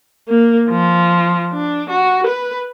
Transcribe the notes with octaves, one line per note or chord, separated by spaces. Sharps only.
A#3
F3
D4
F#4
B4